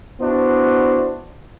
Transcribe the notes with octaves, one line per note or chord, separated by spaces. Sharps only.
B3 D4 E4 F#4 C5